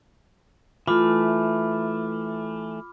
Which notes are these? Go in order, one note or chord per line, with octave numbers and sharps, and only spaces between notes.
E3 A3 F4 B5 D6 F6